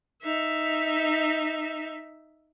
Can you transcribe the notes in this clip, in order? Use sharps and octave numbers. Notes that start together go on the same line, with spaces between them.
D#4 E5